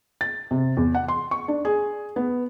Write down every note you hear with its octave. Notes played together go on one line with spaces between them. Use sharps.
A6
C3
E2
F#5
C6
C#6
D4
G#4
B3